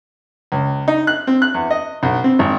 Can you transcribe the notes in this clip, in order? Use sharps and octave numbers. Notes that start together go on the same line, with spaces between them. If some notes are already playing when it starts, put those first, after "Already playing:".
C#2
D#4
F#6
C4
F#6
E2
D#5
B1
C4
G#1